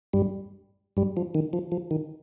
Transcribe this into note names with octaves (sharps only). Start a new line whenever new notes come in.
G2 G3
G2 G3
F3
D#3
F3
F3
D#3